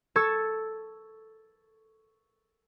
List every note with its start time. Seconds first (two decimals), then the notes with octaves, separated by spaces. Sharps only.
0.16 A4 C#6 E6 G#6 A6